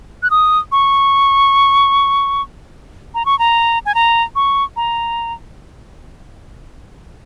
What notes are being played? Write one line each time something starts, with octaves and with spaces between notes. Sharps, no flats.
F#6
D#6
C#6
A#5
C#6
A#5
G#5
A#5
C#6
A#5